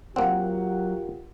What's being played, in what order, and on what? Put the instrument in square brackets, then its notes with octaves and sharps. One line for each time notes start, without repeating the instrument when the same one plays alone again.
[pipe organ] F#3 [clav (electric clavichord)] A#3 C4 [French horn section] F4 G4 A#4 [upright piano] F#5